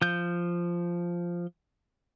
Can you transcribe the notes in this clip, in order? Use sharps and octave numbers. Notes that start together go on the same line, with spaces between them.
F3 G6